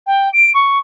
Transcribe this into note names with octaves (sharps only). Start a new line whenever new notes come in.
G5
D7
C#6